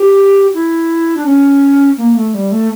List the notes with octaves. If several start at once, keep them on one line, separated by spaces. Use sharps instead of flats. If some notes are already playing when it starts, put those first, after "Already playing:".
Already playing: G4
E4
D4
C#4
A#3
A3
G3
A3